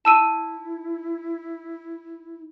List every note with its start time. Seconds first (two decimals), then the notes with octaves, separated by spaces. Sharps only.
0.05 E4 A5 E6 D#7